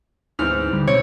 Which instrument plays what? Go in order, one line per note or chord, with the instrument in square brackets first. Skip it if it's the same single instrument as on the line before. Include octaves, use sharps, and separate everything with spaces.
[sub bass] D2 [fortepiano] G#2 E3 C4 [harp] F6
[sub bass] D3 [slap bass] G3
[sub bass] B2 [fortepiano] C4 [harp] C#5